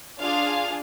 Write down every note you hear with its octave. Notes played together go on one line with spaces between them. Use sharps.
D4 F4 G#4 F5